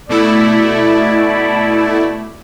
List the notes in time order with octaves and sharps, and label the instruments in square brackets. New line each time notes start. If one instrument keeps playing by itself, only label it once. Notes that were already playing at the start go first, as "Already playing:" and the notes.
[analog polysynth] B2 A3 E4 [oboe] D5